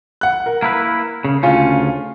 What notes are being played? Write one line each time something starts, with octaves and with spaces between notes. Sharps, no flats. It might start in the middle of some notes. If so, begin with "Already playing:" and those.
F#5 F#6
A#4
A#3 E4 B4
C#3
D2 C#3 C#4 F4